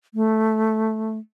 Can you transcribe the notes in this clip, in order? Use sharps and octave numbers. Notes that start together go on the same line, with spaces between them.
A3